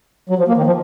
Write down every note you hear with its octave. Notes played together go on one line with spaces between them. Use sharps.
F#3
F3
A#3
D#3
F3